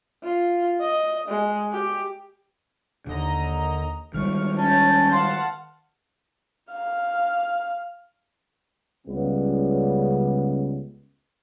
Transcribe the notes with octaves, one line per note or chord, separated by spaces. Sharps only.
F4
D#5
G#3
G4
D#2 D3 D#5 A#5
D#3 G3 G#3 C#6 F6
C#4 A5 G6
F5 F#5 A5 C6
F5 F6
C#2 C#3 G3 B3